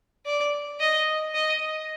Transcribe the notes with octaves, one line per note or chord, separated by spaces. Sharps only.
D5
D#5
D#5